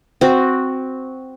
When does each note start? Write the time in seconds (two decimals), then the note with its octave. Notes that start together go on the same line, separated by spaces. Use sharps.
0.21 C4 F#4